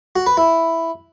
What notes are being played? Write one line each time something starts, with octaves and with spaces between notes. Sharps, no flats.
F#4
B4
E4